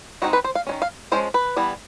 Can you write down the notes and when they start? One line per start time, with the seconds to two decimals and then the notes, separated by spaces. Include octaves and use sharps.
0.22 D#3 G#3 C4 D#4 F#4
0.33 B4
0.44 C5
0.55 F5
0.67 D#3 G#3 C#4
0.82 F5
1.12 F3 G#3 C#4 C5
1.34 B4
1.56 E3 G3 B3